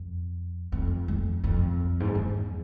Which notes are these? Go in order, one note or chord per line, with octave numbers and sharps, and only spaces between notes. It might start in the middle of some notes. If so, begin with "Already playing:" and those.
Already playing: F2
F2
F2
F2
G#2
F2
E2